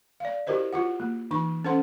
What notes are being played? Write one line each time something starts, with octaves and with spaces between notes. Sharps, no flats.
D5 F5
E4 F#4 G4 A#4 C5 D#5
F4 F#4 F#5
A#3
E3 D#4 C#6
C#4 A4 C5 F#5 C6